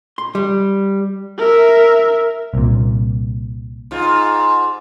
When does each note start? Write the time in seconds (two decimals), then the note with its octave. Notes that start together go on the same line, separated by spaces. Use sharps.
0.18 C6
0.35 G3
1.38 A#4 E5
2.54 C2 A#2
3.91 G#2 F4